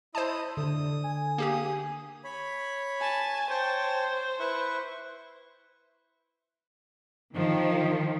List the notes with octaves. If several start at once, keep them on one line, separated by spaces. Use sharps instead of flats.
E4 C5 D#5 A5 D#6
D3 D#6
G#5
A#3 G4 G#4
C#5 B5
G#5 A5
C5 C#5 G5 A5
E4 B4 C#6
D#3 F3